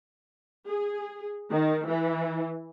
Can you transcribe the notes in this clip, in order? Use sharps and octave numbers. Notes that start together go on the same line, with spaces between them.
G#4
D#3
E3